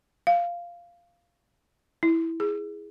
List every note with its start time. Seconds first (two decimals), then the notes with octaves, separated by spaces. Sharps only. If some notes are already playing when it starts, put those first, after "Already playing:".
0.27 F5
2.03 E4
2.40 G#4